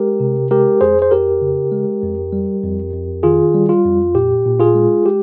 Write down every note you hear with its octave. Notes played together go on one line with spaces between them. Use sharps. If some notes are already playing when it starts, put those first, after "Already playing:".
Already playing: G#3 G4 A#4
C3
G#3 G4 A#4
F2 G#4 C5
C5
F2 G4 A#4
C#3
G#3
F2
G3
F2
F2
D#3 F4 G#4
G3
F4
F2
A#2 G4
A#2
F4 G#4
G#3
G#3 G4